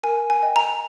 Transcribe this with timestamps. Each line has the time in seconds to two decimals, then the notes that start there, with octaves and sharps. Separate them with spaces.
0.03 A#4 G#5
0.30 G#5
0.43 D#5 G5
0.56 A#5